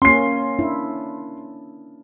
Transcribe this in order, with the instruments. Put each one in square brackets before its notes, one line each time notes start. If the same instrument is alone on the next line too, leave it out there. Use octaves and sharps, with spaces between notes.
[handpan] A#3 C#4 [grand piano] C6 C7
[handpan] D4 E4